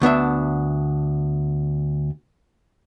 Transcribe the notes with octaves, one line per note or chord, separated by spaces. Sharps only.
D2 B3 D4 E5